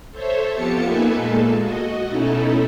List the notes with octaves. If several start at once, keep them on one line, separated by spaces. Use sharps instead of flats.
A4 C5 C#5 E5
F2 B3 F4 G4 A5 C#7
A3 A#3 D#4 B4 E5 G#5
A#2 G#3 A#3 A4
F#4 D#5
B2 A3 C#4 D#4 E4 A4